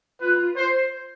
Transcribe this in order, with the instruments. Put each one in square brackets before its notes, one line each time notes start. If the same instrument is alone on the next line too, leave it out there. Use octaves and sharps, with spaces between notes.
[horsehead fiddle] F4 [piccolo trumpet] B4
[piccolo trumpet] C5